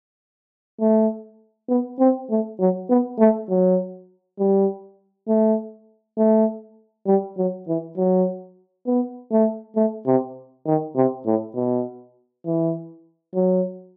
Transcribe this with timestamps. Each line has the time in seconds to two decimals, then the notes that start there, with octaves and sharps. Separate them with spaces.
0.80 A3
1.69 B3
1.99 C4
2.30 A3
2.59 F#3
2.89 B3
3.19 A3
3.49 F#3
4.39 G3
5.28 A3
6.17 A3
7.06 G3
7.37 F#3
7.67 E3
7.97 F#3
8.87 B3
9.31 A3
9.76 A3
10.06 C3
10.66 D#3
10.96 C3
11.26 A2
11.55 B2
12.45 E3
13.34 F#3